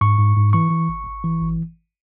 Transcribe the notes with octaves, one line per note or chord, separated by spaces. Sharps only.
G#2 C#6
G#2
G#2
E3 C#6
E3
G#1
G#1
E3
G#1